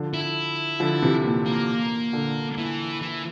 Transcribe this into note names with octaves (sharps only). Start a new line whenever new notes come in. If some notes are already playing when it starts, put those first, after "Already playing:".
Already playing: D3 F3
E4
D3 F3
C3 E3
A#2
A#3
A#2 D3
E3
E3